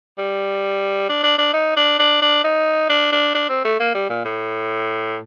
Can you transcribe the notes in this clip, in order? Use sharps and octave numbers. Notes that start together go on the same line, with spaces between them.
G3
D4
D4
D4
D#4
D4
D4
D4
D#4
D4
D4
D4
C4
A3
A#3
G3
A#2
A2